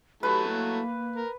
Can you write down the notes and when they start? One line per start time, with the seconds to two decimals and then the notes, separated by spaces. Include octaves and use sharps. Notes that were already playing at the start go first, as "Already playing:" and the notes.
0.23 F#3 A3 E4 G4 B4
0.49 A#3
1.16 A#4